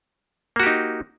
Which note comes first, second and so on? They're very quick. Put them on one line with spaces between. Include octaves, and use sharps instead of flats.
A#3 F#4 G4 D#4